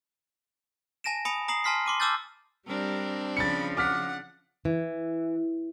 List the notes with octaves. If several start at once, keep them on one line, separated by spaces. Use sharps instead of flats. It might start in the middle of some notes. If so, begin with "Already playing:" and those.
G#5 A5 A#6 D7 E7
G#5 B5 D#6 C#7 D7
A#5 D#6 C7 F#7
G#5 A5 C6 F6 B6 C7
C6 D6 D#7
A5 D6 E6 F6 G6 A6
G3 C4 D4 A#4
C#3 F3 B5 A6 C#7
F#5 D6 F6 B6
E3